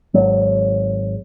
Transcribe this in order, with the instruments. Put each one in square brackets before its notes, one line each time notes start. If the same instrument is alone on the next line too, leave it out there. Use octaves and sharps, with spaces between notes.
[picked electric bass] G#1 F#3